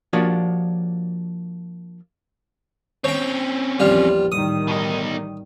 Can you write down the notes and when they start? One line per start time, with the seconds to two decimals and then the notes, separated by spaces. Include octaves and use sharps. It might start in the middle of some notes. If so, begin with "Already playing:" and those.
0.13 F3 A#3 D4 F#4 G4 C#5
3.04 C4 C#4 C#5 G5
3.80 A#1 E2 G3 F4
4.32 A1 D#3 G3 D#6
4.68 B2 D#4